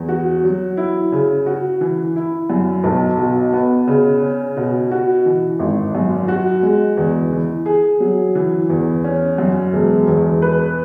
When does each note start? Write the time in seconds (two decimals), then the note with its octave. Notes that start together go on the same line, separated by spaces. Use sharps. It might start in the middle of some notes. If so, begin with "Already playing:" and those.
Already playing: E2
0.08 F#4
0.44 F#3
0.77 E4
1.12 C#3
1.46 F#4
1.81 E3
2.16 E4
2.50 F#2
2.84 B1
3.19 B2
3.53 B3
3.87 C#3
4.22 C#4
4.57 B2
4.91 F#4
5.26 E3
5.59 G#1
5.95 F#2
6.28 F#4
6.63 G#3
6.97 E2
7.32 E3
7.66 G#4
8.00 F#3
8.35 E3
8.70 E2
9.04 C#4
9.38 F#2
9.73 E1
10.07 E2
10.42 B4